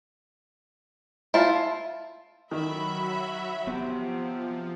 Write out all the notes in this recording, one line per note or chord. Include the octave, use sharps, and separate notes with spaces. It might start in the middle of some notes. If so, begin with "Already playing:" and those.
E4 F4 A5
D#3 F#3 F#4 E5 B5
C3 F3 B3